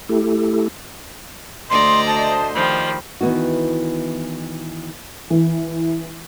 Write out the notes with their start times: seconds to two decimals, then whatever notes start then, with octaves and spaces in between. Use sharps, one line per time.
0.09 A3 E4 G4 A4
1.70 D2 C5 D5 D#5 A#5 C6
2.07 A5
2.54 D#3 F3 G3 B5
3.21 D#3 E3 B3 E4 F#4
5.30 E3